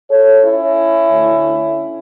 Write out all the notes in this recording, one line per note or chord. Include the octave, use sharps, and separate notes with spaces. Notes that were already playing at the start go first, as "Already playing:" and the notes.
A4 C#5
C#4 E4
D2 D3 A3